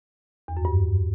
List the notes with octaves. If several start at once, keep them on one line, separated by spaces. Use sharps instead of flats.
E2
F#2
G2